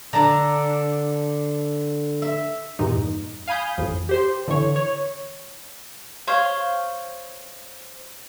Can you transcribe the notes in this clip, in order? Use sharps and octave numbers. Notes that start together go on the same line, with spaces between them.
D3 D4 A5 A#5
E5
E2 G2 A#2 D#4
F5 G#5 B5 D#6 G6
A1 F2
G4 C5 C6
D3 E3 C#5
C#5
C5 C#5 F5